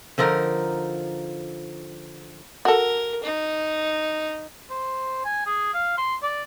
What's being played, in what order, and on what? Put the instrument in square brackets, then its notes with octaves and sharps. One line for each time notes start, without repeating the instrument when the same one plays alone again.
[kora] D3 F3 D#4 A#4
[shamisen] F#4 A4 [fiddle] A#4
[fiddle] D#4
[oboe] C5
G#5
G#4
F5
C6
D5